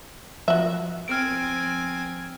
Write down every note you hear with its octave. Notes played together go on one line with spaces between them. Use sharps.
F3 F#4 E5
C4 G#5 F6 D7